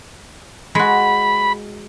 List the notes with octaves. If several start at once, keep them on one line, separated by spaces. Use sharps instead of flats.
G#3 F#4 B5